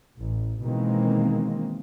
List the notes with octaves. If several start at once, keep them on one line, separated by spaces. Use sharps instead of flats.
A1
B2 D#3 E3 G#3 A#3 C4